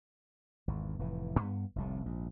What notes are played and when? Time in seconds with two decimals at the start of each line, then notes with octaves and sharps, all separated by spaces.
0.68 G#1 E2
0.99 F1 A2 E3
1.40 G2 B3
1.76 F1 C2 A2
2.04 A#1 G#2